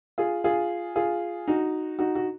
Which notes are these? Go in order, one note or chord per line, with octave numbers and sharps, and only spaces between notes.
F4 G#4
F4 G#4
F4 G#4
D#4 F#4
D#4 F#4
F#4